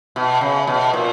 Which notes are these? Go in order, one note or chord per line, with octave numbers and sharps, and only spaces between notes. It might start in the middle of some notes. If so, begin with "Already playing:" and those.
B2
C#3
B2
A#2